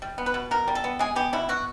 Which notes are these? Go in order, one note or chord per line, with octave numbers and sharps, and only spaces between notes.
G3
B3
B4
B2
B2 A#4
G3
A4
B3
G#3 G#4
B3 G4
B2 E4
B2 F#4